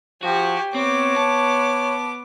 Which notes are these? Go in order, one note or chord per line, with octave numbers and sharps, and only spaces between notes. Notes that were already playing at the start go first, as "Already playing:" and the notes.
F3 F#4 G4 G#5
B3 C4 C#5 D6
A5